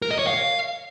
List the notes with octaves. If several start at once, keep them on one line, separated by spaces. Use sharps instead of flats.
A#4
D#5
C#5
F5